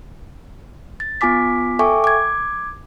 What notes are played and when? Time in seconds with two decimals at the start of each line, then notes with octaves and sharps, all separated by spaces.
1.00 A6
1.21 B3 F4 G#5 D6 B6
1.79 A4 E5 G5 G#5 C#6 D6
2.04 D6 G#6